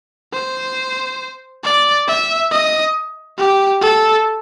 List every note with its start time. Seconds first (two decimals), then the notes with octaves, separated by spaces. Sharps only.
0.33 C5
1.64 D5
2.08 E5
2.51 D#5
3.38 G4
3.81 A4